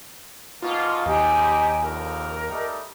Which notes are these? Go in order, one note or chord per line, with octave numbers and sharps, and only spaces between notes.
G#2 B2 A#3 F4
D#2 D#4 G4 G#5
A#1 F2 A#4
G3 A3 D#4